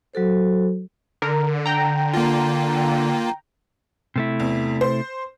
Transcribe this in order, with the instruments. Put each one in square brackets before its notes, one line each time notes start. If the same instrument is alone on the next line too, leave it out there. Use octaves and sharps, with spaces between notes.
[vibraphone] F#3 F#4 A4 C5
[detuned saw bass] D3 [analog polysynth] A#4
[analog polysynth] G5 A#5
[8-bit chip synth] A#3 F4
[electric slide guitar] C3 A3 E4
[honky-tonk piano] E2
C5